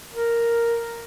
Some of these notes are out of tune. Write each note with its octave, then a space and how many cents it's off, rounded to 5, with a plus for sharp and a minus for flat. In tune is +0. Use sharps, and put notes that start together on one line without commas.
A#4 +0